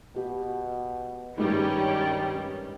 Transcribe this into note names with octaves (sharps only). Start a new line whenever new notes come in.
B2 G4
G2 D#3 G3 G#3 C#4 D#4